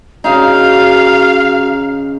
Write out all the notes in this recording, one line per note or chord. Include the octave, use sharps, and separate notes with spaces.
C#3 D#4 F#4 F5